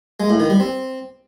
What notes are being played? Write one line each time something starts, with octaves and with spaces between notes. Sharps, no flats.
G#3
A2
D#3
G3
C4